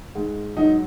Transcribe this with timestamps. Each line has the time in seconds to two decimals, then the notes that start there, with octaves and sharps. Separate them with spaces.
0.15 G#2
0.57 F#3 D#4